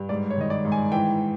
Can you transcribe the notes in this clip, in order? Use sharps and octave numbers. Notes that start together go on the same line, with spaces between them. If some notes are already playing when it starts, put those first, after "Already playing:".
Already playing: G2
G#2 D5
C#5
D#3 D#5
D5
G#2
G#5
E3 G5